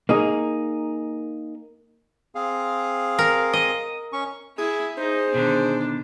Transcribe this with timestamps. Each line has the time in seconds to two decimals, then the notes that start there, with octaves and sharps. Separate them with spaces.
0.09 A#3 D#4 G#4
2.35 C4 G#4 F5
3.19 A#4
3.53 D#5
4.13 C#4 C#6
4.58 E4 G#4
4.97 D#4 G#4 C5
5.34 B2 D3 D#3 D4